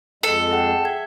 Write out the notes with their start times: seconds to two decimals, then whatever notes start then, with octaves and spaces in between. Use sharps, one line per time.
0.23 F2 G#3 A4
0.51 G#4 F#5 G5
0.85 E5 G#6